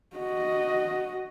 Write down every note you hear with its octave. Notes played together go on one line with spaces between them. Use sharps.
F#4 D#5